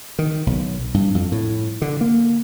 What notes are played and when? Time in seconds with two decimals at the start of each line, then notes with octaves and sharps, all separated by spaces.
0.19 D#3
0.47 B1
0.94 G2
1.15 F2
1.32 A2
1.82 D3
2.01 A#3